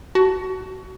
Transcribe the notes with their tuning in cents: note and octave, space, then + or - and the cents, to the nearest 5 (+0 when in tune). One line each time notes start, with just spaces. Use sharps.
F#4 +30 A5 +0